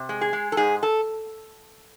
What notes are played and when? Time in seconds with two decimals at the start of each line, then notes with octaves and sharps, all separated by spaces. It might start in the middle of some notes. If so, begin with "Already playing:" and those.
Already playing: C3
0.09 G#3
0.21 G#4
0.33 G#3
0.52 A4
0.57 G#2 G#4
0.83 A4